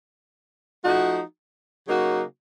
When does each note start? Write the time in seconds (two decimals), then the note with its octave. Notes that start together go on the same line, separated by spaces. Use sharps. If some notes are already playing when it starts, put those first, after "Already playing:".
0.84 F3 A3 D#4 F#4
1.87 C#3 F#3 A#3 D#4 F#4